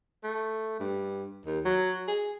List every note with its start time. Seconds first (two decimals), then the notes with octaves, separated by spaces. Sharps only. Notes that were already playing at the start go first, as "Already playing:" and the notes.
0.24 A3
0.80 G2
1.46 D#2
1.65 F#3
2.08 G#4